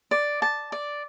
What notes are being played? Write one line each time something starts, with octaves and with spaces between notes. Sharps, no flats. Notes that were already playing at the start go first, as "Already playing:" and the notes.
D5
A5
D5